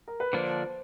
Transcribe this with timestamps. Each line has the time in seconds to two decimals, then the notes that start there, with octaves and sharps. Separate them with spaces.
0.08 A#4
0.20 B4
0.33 D3 F3 A#3 D4 C5